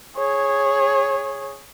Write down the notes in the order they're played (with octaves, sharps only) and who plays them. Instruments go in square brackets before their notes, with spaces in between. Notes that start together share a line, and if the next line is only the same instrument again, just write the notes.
[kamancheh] G#4 C#5